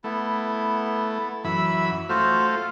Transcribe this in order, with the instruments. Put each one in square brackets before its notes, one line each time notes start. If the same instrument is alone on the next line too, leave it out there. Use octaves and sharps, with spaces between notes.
[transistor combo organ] A3 [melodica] B3 E4
[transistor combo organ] F#2 E3 [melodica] E5 B5 E6
[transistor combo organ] A3 F4 [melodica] F#4 C5